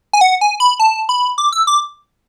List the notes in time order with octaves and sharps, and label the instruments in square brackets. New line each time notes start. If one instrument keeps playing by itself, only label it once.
[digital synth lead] G#5
F#5
G#5
B5
A5
B5
D6
E6
D6